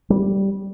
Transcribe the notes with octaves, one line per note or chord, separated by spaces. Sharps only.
G3